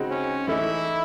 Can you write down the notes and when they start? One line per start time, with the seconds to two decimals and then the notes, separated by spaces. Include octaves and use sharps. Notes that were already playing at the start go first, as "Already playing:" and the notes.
Already playing: C#3 G#3 C4 D#4 F#4
0.11 C#4
0.47 E3 A3 D#4 E4